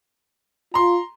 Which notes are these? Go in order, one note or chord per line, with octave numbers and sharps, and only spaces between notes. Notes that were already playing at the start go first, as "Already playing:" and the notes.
F4 A#5 C6